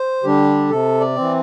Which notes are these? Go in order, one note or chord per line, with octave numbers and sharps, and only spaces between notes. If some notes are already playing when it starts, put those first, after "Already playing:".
Already playing: C5
D3 G3 D4 G4
C3 A4
D5
E3 C4